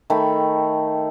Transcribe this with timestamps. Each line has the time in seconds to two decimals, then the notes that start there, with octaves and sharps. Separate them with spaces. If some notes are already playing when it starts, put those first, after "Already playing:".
0.10 D#3 A3 G5 B5